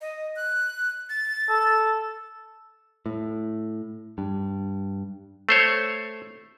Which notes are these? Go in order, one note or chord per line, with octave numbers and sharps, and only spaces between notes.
D#5
F#6
A6
A4
A2
G2
A3 C5 C#5